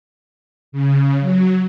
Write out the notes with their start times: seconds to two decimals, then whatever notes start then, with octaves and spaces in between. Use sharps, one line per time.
0.72 C#3
1.20 F#3